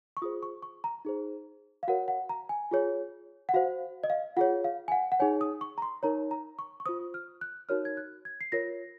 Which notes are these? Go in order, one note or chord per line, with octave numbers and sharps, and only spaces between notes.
C#6
F4 G#4 C5 D#6
C#6
C#6
A#5
D#4 G#4 C5
F5
F#4 A#4 C#5 F#5
F#5
A#5
G#5
F4 G#4 C#5
F#5
F#4 C5 F5
D#5
F5
F4 G#4 C#5 F#5
F5
G#5
F#5
F#5
D#4 G#4 C#5 G#5
D#6
C#6
A#5
C6
D#4 A#4 C#5 A#5
A#5
C#6
C#6
F4 C5 D#6
F6
F#6
D#4 F#4 A#4 C#5 F6
G#6
F#6
G#6
C7
F4 A#4 C#5 A#6